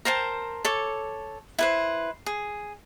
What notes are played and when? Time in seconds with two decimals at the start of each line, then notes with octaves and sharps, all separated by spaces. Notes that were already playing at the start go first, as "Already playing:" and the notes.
0.05 A#4 C5 G5 A5
0.65 A4 C#5 D6
1.59 E4 B4 C5
2.26 G#4